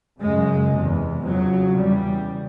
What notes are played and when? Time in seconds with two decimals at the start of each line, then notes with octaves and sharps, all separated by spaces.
0.21 F#2 C#3 G#3
0.73 E2 C3
1.24 F2 C#3 F#3
1.76 E2 C#3 G3